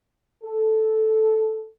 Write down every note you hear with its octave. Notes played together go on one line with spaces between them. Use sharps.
A4